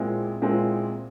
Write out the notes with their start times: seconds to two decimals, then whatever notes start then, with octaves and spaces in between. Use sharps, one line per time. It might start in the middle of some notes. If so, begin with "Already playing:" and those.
Already playing: A#2 G#3 C4 E4
0.42 A#2 G#3 C4 E4